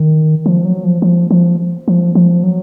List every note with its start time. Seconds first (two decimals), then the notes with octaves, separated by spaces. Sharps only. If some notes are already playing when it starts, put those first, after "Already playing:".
Already playing: D#3
0.46 F3
0.65 F#3
0.84 F3
1.02 F3
1.31 F3
1.88 F3
2.15 F3
2.43 F#3